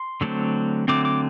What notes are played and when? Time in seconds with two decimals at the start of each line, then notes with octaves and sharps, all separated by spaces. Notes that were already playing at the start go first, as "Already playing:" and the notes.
Already playing: C6
0.21 D3 F#3 A3 C4
0.88 D3 F#3 A3 C4 D6
1.05 D6